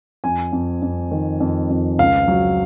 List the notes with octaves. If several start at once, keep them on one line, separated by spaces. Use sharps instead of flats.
F2 G#5
F2
F2
D#3
F2
F2
C#2 F5
F#3